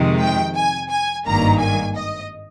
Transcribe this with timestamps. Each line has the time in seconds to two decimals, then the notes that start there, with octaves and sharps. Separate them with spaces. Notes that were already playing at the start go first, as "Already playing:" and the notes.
Already playing: F2 C3 D#3 G#3
0.22 G5
0.56 G#5
0.91 G#5
1.26 G#1 G2 D#3 A#3 A#5
1.60 G#5
1.96 D#5